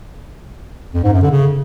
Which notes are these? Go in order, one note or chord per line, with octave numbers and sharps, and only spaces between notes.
F2
G#2
F#2
D3
C#3